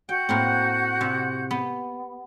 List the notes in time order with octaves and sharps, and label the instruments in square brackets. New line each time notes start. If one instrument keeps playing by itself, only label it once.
[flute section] F#4 F#5 G6 [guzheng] G5
[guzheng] A2 A#3 C4
C3
B3